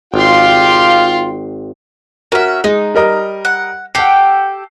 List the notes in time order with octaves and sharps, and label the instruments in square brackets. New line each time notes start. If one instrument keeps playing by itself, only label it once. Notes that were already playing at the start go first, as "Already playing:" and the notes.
[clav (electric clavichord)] G#1 [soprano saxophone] F4 [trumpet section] G4 F5 [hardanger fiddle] G5 C6
[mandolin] C#4 E5 [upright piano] F#4 A#4
[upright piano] G#3 [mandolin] D#4
[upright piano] G3 A#4 D#5
[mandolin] F#5
[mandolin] G4 A4 G5 [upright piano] F#5 C7